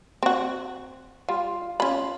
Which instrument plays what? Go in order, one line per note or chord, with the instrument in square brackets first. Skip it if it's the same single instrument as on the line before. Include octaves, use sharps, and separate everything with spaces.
[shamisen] C4 F#4
[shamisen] G3 [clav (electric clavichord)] F4
[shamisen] C#4 B5 [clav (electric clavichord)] F4